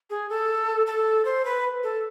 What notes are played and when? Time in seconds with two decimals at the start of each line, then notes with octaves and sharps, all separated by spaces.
0.10 G#4
0.30 A4
0.87 A4
1.25 C5
1.45 B4
1.83 A4